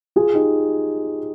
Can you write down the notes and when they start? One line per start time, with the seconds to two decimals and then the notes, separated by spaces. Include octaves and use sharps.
0.16 F4 G#4
0.34 D#4 G4